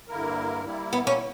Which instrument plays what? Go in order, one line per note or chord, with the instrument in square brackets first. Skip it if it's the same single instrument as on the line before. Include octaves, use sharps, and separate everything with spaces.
[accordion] G2 D3 A#3 E4 A#4
G3 A#3 E4
[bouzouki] B3
C#4